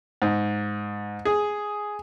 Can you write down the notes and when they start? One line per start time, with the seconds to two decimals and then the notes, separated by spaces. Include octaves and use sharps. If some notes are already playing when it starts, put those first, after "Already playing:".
0.22 G#2
1.25 G#4